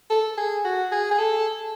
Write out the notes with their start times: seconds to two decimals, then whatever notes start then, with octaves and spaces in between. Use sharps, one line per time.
0.10 A4
0.38 G#4
0.65 F#4
0.92 G#4
1.11 G#4
1.18 A4